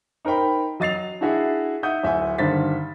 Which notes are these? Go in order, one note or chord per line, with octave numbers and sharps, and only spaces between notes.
D#4 A#4 C5 G5 B5
F#3 D#5 A6 C7 F7
D4 E4 F#4 G#4 E5
D#4 E5 F#5 D#6 G6
D1 E5 F#5 G#5
G2 D3 D#3 C5 A6 B6